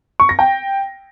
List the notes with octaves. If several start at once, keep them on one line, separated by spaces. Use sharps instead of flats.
C#6
A#6
G5